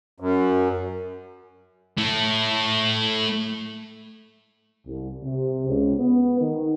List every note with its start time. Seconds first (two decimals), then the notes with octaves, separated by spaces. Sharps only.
0.20 F#2
1.98 A3 E4
4.86 C2
5.22 C3
5.66 C#2
5.98 B3
6.39 D#3